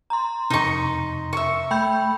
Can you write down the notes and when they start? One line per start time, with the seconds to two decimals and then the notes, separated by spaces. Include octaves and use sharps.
0.10 A#5 C6
0.50 F2 C3 D#4 C#6
1.33 E5 C#6
1.71 A3 G5 B5 G6